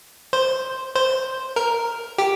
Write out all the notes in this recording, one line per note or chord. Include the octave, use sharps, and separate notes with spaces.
C5
C5
A#4
G4